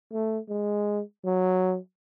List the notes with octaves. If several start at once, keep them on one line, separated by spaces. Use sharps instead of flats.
A3
G#3
F#3